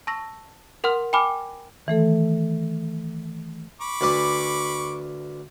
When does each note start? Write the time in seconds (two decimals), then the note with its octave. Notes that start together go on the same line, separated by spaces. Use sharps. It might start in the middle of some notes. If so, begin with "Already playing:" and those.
0.07 A5 C#6 E6 A#6
0.84 A#4 F#5 C6 F6
1.13 G5 G#5 B5 D6 F6
1.87 D#3 E3 A3 A4
3.81 B5 C#6 D6
4.01 D2 B4 D5